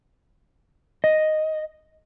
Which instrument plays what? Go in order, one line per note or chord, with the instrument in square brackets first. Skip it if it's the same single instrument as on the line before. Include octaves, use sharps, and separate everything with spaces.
[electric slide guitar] D#5